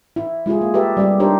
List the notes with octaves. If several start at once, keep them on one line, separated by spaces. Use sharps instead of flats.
E4
G#3 E4 F4 G#4
A#3
G4 A4 B4 E5
G3 C4 G4
D4 D#4 G4 A#4 C5 C#5